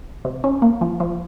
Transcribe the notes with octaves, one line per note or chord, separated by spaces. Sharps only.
C3
C#4
A#3
F3
F3